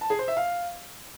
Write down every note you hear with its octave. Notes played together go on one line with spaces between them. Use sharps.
A5
G#4
C5
E5
F5